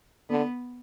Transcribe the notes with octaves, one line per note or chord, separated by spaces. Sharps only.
D3 B3